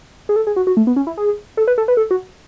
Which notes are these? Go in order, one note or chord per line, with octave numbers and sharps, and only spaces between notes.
G#4
A4
G#4
F#4
F#4
A3
B3
C#4
E4
G#4
A4
B4
A4
B4
A4
F#4